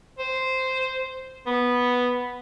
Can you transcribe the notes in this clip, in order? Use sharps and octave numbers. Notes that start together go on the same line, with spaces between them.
C5
B3